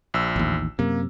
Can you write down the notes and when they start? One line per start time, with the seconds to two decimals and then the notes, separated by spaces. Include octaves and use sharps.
0.14 A#1 E6
0.36 A1 D#2
0.79 F#2 C3 A#3